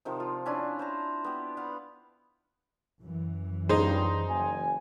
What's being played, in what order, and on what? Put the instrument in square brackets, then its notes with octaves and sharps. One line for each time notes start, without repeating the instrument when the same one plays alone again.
[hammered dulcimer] C3 D#3 F3
F4
C#4 D4 E4 F4
C5 A5 A#5
B3 G4
B4 F5 F#5
[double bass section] F#2 E3
[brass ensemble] C#2 G2 [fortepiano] D#4 C5 [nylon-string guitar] G#4
[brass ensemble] F#1 G#5